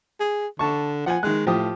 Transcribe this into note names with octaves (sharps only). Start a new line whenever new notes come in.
G#4
D3 A5 C#6
F3 F#5 G#5
D#3 G#3 F#6
A2 F3 G4 D#6